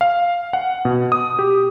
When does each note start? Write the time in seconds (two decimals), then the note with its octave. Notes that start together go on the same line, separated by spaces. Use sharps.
0.01 F5
0.53 F#5
0.85 B2
1.12 D#6
1.39 G4